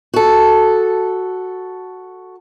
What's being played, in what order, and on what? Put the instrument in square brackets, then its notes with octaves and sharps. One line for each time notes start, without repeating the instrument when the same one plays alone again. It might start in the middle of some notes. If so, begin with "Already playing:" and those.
[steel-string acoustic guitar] F#4 A4